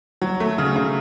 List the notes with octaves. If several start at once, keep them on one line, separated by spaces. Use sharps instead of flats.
F#3
A3
C#3
C#3